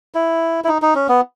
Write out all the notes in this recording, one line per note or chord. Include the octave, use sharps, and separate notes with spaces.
E4
E4
D#4
D#4
C#4
B3